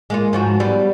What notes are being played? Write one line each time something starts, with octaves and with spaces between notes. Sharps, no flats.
G#3 A#3 F4
G#2 F3 F#4
G3 B3